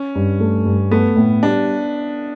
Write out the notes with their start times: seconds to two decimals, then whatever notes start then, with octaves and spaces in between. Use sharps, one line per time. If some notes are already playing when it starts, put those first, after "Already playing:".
Already playing: C#4
0.15 G2
0.40 A3
0.65 G2
0.91 A3 B3
1.16 A2
1.43 G3 D4